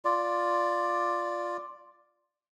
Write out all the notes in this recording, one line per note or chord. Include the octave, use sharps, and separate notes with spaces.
F4 D5